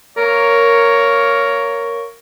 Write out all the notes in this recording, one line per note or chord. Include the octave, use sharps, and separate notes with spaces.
A#3 A#4 C#5